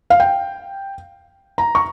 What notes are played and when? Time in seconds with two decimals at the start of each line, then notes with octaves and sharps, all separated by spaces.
0.10 F5
0.20 G5
1.58 A#5
1.75 C#6